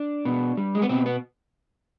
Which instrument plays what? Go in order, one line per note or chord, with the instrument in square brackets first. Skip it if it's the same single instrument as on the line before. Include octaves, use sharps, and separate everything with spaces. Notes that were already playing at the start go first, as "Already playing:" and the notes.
Already playing: [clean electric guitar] D4
B2
G3
G#3
B3
B2 C4
B3